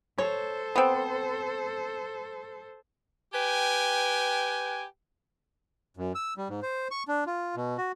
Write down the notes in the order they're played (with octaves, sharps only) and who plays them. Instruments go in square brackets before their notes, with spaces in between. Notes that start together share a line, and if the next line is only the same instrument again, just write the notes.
[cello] A4 C5 [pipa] C#5
[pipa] B3 C4
[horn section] G4 B4 G5 G#5
[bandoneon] F#2
E6
G3
G#2
C5
C#6
D4
F4
B2
F#4